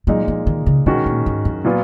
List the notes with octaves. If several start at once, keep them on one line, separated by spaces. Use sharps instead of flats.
A#2 F#3 G#3 D#4
F3
D#3
C#3
B2 D#3 G#3 C#4 F#4
A#2
G#2
F#2
A#2 F#3 B3 F4